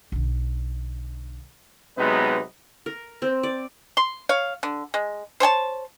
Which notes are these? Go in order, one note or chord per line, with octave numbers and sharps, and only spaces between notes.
B1 D3
C3 F#3 G#3 B3 D#4 B4
A#4
C4
D5
C6
C#5 F5
D3
G#3
C5 C#5 G#5 A5